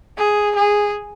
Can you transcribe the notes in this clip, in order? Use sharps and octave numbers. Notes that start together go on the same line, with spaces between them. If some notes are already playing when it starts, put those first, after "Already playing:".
G#4
G#4